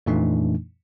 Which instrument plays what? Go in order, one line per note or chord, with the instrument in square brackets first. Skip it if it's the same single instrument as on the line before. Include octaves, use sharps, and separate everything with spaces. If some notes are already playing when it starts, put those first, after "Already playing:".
[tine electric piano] F2 A#2 E3 A3 D4 D#4